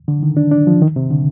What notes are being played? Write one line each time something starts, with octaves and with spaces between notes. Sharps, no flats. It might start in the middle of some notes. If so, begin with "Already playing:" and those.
D3
D#3
D4
D4
F3
D#3
C3
D3